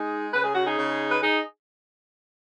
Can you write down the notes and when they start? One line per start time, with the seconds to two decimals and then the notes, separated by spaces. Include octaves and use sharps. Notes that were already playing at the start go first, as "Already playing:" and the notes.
Already playing: G#3 D#4 G#4
0.33 C#3 B4
0.44 G#4
0.55 F#4
0.65 D#4 G#4
0.77 C#3
1.11 B4
1.22 D#4 G#4